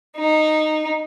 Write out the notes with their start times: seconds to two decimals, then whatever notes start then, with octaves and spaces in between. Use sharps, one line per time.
0.16 D#4